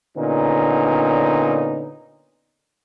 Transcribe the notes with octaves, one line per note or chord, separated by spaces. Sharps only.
A#2 D3 B3 C#4 D#4